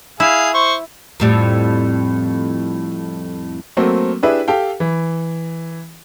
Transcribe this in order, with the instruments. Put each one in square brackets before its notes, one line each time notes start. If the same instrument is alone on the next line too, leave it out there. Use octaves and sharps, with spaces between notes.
[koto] E4 [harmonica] G#4 F5
[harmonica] C5 C#6
[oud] F2 A2 G3
[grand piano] F#3 A3 A#3 C4
D4 E4 G4 G#4 B4 E5
G4 A4 F5 G5
E3